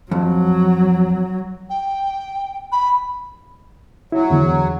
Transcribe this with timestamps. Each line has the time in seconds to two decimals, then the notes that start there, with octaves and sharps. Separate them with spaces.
0.11 F2 F#3
1.70 G5
2.72 B5
4.12 F#3 E4
4.30 E2 D3